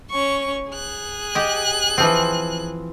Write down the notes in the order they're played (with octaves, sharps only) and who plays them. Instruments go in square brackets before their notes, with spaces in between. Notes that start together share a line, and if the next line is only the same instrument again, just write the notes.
[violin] C#4 C#6
G#4 F#6
[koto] G4 D#5
E3 F3 C4